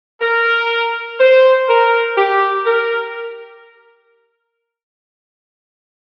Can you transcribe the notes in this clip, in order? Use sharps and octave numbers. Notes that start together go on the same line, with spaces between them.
A#4
C5
A#4
G4
A#4